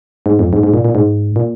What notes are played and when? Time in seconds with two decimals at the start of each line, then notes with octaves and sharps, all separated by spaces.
0.26 G#2
0.39 F2
0.53 G#2
0.63 G#2
0.74 A#2
0.85 A#2
0.95 G#2
1.36 A#2